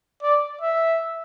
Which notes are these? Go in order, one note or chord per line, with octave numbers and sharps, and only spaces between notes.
D5
E5